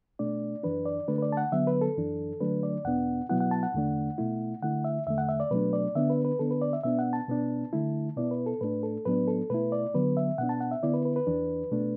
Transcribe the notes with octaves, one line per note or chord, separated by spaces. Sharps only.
B2 A3 D4 D5
F#2 E3 D4 B4
D5
D3 A3 D4 B4
B4
D5
A5
F#5
D3 F#3 B3 E5
B4
A4
F#2 E3 D4
D3 F#3 A3 D4 B4
D5
E2 B2 B3 D4 F#5
B2 F#3 B3 E4 F#5
F#5
A5
F#5
E2 D3 A3 D4
B2 A3 E4
D3 A3 E4 F#5
E5
E2 D3 A3 E5
F#5
E5
D5
B2 F#3 A3 D4 B4
D5
D3 B3 D4 E5
B4
B4
D3 B3 D4 A4
B4
D5
E5
B2 B3 D4 E5
F#5
A5
B2 B3 D4
D3 A3 E4
B2 B3 E4 D5
B4
A4
A2 A3 D4 B4
A4
A2 F#3 B3 D4 B4
A4
B2 A3 E4 B4
D5
D3 F#3 B3 B4
E5
B2 B3 D4 F#5
A5
F#5
E5
D3 B3 E4 D5
B4
B4
B4
E2 E3 D4
B2 A3 D4